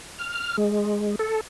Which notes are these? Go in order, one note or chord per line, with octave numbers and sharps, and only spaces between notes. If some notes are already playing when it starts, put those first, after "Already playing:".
F6
G#3
A4